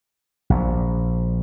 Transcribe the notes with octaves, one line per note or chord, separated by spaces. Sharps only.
A#1